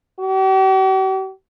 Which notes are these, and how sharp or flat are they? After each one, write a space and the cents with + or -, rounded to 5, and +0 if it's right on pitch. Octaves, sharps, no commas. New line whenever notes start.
G4 -45